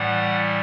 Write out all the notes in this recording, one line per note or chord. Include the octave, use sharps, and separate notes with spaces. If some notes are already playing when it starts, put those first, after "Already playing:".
Already playing: A2 E3 G3 F#5